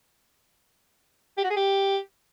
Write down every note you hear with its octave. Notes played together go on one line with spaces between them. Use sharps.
G4
F#4
G#4
G4